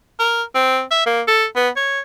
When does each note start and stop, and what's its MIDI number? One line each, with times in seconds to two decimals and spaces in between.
0.19 0.43 70
0.55 0.82 60
0.91 1.06 76
1.06 1.21 58
1.28 1.45 69
1.56 1.69 59
1.77 2.00 73